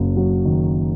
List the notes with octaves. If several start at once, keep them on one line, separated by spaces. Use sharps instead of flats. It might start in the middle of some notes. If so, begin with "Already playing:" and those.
Already playing: F#1 F#2
F#3
D#3